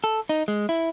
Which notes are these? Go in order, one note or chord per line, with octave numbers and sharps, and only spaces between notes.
A4
D#4
G#3
E4